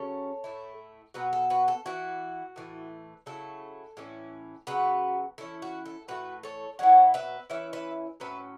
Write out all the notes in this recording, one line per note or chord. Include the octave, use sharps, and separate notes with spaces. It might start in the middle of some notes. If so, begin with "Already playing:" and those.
Already playing: C#3 F#3 C#4 A4 C#5
A2 A3 E4
B2 F#3 B3 F#4 B4
A4
F#4 B4
A4
E3 B3 E4 F#4
A2 E3 A3
C#3 F#3 A3 E4 A4
A2 E3 C#4 E4
C#3 F#3 B3 F#4 B4
E3 C#4 E4 A4
F#4
A4
A2 E3 A3 F#4 B4
A4 C#5
B2 F#3 B3 E4 C#5 F#5
B4 E5
E3 C#4 E4 B4 E5
B4 E5
A2 F#3 C#4 B4 E5